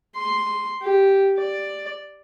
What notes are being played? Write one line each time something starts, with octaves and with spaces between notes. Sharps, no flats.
C6
G4
D5